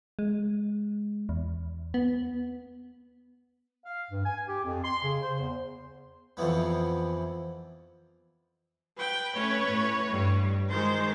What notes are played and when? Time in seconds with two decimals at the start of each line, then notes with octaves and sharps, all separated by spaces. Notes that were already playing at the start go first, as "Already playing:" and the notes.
0.19 G#3
1.29 E2
1.94 B3
3.85 F5
4.11 G2
4.24 G#5
4.47 G4
4.64 F2
4.84 C6
5.02 C#3
5.22 C5
5.39 E2
6.37 F2 C3 E3 B3
8.97 B4 G5
9.34 A3 C#4 B4 C#5
9.68 A2
10.10 G2 G3
10.70 D#3 G#3 C5